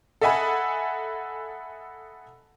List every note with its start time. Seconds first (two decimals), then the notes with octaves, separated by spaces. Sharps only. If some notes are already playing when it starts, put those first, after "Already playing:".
0.21 A4 D#5 E5 F#5 G#5 B5